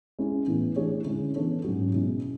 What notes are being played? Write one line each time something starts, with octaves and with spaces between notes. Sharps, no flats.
G#3 C#4 E4
A2 E3 B3
E3 A3 D4 G#4 C#5
D3 G#3 C#4 E4
E3 B3 D4 A4 C#5
G#2 F#3 C#4 F#4
B2 G#3 C#4 E4